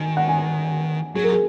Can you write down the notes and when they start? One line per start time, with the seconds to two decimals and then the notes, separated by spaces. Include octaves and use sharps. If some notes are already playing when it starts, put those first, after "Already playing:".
Already playing: D#3 G#5
0.17 F#5
0.29 G#5
1.16 F#3 G#4
1.24 A#4
1.32 G#4